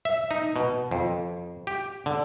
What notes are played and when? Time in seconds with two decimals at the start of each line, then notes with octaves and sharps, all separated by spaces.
0.05 E5
0.31 D#4
0.56 B2
0.91 F2
1.67 G4
2.06 D3